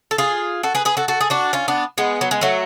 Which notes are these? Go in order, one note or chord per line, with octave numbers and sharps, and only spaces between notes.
A4
F4 G#4
F#4 A4
G#4 B4
G#4 B4
F#4 A4
F#4 A4
G#4
D4 F#4
C#4 F4
B3 D4
G#3 B3
F#3
G#3
F#3 A3